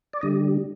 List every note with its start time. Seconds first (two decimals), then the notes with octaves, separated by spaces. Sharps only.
0.13 D5
0.21 D3 G3 D#5